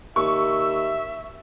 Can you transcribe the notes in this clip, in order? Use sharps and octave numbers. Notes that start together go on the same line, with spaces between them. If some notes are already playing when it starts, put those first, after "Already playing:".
D#2 E5 C#6 E6